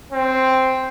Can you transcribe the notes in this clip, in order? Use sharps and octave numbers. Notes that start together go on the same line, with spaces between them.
C4